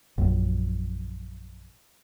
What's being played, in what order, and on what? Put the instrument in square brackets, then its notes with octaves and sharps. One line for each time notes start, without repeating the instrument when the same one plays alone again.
[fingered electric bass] A#1 F#2